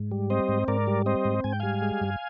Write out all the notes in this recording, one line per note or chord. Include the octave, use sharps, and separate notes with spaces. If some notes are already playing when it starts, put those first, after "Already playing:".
Already playing: G#2
G3
C4 C5 D#5
G#2
G#2 A#4 D5
G3
C4 C5 D#5
G#2
G#2 G#5
G5
G3 F5 G#5
G#3
G2